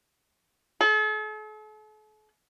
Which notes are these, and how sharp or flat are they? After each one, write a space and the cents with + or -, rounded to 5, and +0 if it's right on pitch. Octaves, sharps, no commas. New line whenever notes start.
A4 -45